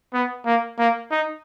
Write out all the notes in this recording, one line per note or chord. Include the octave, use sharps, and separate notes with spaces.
B3
A#3
A#3
D#4